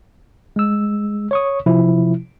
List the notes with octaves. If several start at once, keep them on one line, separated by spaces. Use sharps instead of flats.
G#3 E6
C#5 C#6 D#6
C3 F3 E4